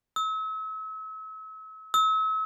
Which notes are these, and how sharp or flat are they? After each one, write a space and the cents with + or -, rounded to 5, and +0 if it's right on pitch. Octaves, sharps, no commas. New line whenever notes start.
E6 -40
E6 -40